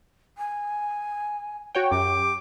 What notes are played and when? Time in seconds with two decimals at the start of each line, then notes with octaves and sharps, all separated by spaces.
0.38 G#5
1.75 F#4 C#5 G5
1.91 F#2 G4 D6